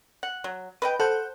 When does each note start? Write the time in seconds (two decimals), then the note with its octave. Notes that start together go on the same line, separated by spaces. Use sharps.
0.23 F#5
0.44 F#3
0.82 B4 D#5 G5
1.00 A4 C5 F#5 G6